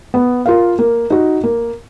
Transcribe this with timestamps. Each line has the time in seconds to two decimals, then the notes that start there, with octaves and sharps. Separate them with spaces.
0.14 B3
0.46 F4 A#4 F5
0.79 A#3
1.10 D#4 F#4
1.44 A#3